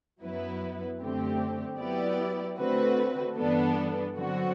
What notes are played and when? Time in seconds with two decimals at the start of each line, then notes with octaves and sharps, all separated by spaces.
0.21 F#2 F#3 B3 E4 B4
1.00 F#2 D3 A3 C4 G4
1.78 F#3 B3 E4 G4 D5
2.57 D3 A3 C4 F#4 B4
3.36 G2 E3 B3 D4 A4
4.15 D3 F#3 C4 F#4